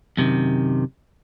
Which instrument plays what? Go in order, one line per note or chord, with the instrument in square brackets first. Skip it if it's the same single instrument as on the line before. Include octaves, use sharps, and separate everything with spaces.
[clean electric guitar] F#2 C3 D#3